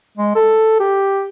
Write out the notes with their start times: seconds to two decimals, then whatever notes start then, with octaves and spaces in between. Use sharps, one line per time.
0.17 G#3
0.35 A4
0.80 G4